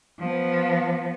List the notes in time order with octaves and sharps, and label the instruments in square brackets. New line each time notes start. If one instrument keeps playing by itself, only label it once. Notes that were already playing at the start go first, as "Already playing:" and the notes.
[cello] F3 B3